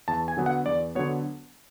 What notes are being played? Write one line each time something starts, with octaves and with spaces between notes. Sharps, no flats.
E2 A5
G#5
D3 F#3 B3
F#5
E2 D5
D3 F#3 B3 C#5